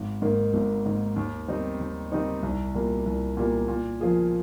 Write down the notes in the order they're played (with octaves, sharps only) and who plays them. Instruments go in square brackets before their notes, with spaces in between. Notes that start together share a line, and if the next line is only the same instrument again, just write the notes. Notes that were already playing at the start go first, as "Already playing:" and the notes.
Already playing: [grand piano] G#1
G#2 D#3 A#3
G#1
G#2 D#3 A#3
D#2
D#3 G3 C4 D#4
D#2
D#3 G3 C4 D#4
C2
A#2 G3 A#3
C2
A#2 G3 A#3
A#2
F3 A#3 F4 G#4